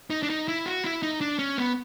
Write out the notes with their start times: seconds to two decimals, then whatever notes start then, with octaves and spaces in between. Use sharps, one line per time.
0.10 D#4
0.23 D4
0.30 D#4
0.48 E4
0.66 F#4
0.84 E4
1.03 D#4
1.21 D4
1.39 C#4
1.58 B3